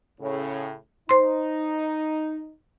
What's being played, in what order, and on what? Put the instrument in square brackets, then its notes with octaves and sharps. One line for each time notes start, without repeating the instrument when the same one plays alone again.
[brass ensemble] A2 C#3
[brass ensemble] D#4 [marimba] C5 C6